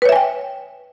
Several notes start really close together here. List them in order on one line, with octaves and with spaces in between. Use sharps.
B4 C#5 E5 G#5 G5